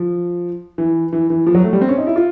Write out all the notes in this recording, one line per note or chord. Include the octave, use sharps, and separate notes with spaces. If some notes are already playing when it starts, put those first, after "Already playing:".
Already playing: F3
E3
E3
E3
F3
F#3
A3
G3
C4
C#4
D#4
E4
F4